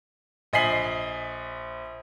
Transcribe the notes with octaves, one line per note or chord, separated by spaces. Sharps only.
A#1 D#5 G#5 B6 C7 F#7